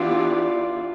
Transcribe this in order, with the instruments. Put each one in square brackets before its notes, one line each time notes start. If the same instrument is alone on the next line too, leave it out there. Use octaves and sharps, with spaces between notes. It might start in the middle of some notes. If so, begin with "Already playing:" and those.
Already playing: [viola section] E3 B3 E4 G4 D5 [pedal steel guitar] D4 F4